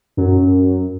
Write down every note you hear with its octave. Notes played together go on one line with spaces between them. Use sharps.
F#2